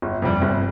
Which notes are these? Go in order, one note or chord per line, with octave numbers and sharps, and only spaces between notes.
G1
F2 C3 G3
G1